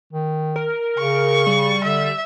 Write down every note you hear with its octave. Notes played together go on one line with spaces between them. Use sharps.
D#3
A#4
C#3 C#6
G3
D3 E5